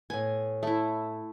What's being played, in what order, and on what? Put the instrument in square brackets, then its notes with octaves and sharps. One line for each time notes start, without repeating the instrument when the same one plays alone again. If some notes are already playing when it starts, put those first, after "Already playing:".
[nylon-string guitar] A2 B3 [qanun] G#5
[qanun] A3 E4